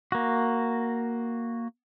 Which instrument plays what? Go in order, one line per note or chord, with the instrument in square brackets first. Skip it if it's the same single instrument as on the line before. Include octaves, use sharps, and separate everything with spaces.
[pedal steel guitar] A#3 F#4